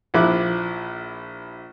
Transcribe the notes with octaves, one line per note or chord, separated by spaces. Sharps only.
A#1 F3 E4 D6 F#6